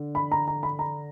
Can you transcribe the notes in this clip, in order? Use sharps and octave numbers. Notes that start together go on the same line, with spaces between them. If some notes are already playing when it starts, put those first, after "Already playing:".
Already playing: D3
B5
A#5
A#5
B5
A#5